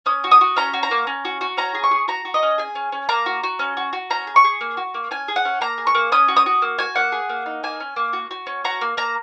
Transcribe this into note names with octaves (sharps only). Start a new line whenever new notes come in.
C#4 D#6
F#4
D#6
F#4
C#4 A#5
F#4
A#5
A#3
C#4
F#4
F#4
C#4 A#5
G#4
C#6
G#4
F#4 A#5
F#4
D#5
C#4
G#4 G#5
C#4
C#4
A#3 A#5
F#4
F#4
C#4
F#4
F#4
C#4 A#5
G#4
C#6
G#4
A#3
F#4
A#3
C#4 G#5
G#4
F#5
C#4
A#3 A#5
G#4
C#6
A#3
C#4 D#6
F#4
D#6
F#4
A#3
F#4 G#5
A#3 F#5
G#4
A#3
D#4
A#3 G#5
C#4
A#3
F#4
F#4
C#4
F#4 A#5
A#3
A#3 A#5